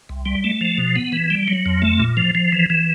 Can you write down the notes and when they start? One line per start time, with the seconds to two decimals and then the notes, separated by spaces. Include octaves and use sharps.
0.09 C2
0.26 G3
0.44 A3
0.61 F3
0.78 B2
0.96 B3
1.12 E3
1.30 G3
1.48 F#3
1.66 F2
1.82 A3
1.99 A#2
2.17 F3
2.35 F3
2.52 E3
2.70 E3